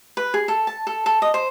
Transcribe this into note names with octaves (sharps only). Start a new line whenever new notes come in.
B4
G#4
A4
A5
A4
A4
D#5
C5